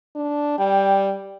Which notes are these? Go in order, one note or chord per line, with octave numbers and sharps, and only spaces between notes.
D4
G3 G5